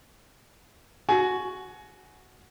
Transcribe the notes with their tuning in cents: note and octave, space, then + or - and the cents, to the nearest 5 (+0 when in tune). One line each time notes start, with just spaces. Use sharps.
F#4 +0 G#5 +25